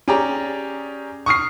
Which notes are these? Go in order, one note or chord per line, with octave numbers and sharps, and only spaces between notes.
C#4 G4 G#4 D5 A#5
C#6 D#6 F6 C7